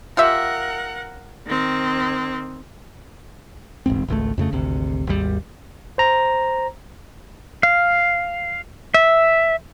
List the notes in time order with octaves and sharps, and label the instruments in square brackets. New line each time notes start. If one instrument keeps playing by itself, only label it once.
[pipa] F4 G4 E5 [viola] A#4 F#5
[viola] D#3 C4
[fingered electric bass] E1 A1 G#2 C4
G#1 C#2 C#3 A3
F2 C#3 A3
G#1 D2 C3
G#1 D#2 G3
[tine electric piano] C5 A#5
[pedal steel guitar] F5
E5